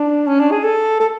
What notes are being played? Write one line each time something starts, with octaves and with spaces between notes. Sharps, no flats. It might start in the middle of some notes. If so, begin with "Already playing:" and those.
Already playing: D4
C#4
D4
G#4
A4
A4